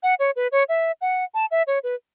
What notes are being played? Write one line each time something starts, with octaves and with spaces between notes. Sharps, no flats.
F#5
C#5
B4
C#5
E5
F#5
A5
E5
C#5
B4